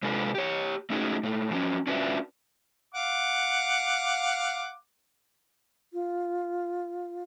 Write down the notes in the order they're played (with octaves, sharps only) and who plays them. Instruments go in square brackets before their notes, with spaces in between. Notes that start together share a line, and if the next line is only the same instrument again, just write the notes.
[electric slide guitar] C3 G#3 D4 F4 A4 B4
G4 C#5
A3 C#4 D#4 F4 F#4 G#4
A#2 A3
F3 F#3 C4 C#4
C#4 D4 F4 F#4 B4 E5
[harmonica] F5 F#5 D6
[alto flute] F4